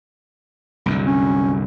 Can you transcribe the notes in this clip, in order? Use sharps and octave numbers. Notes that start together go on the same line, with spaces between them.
C2 F#2 D3
C#4